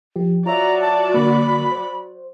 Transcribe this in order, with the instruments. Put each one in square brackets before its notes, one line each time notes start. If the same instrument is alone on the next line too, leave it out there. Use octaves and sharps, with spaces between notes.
[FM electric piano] F3 G4
[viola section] F#3 F#4 D5 [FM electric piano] F4 C#5 E5 [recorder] A#5
[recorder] A5
[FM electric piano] D3 A#3 [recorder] B5
[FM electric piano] C5